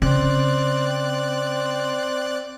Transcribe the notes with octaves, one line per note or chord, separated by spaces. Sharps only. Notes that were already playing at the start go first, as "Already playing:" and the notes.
C#3 C4 D5 F#6